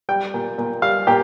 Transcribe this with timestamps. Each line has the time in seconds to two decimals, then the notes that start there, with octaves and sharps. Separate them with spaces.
0.09 G3 G5
0.34 A#2
0.58 A#2
0.82 G3 F5
1.07 A#2 G4